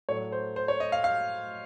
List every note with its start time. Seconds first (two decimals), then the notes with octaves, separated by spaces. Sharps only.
0.09 A2 F#3 A3 C#5
0.32 C5
0.56 C5
0.68 C#5
0.80 D#5
0.92 F5
1.04 F5